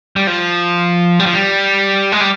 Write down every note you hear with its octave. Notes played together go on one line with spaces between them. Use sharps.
G3
F3
G3
F3
G3
G#3
G3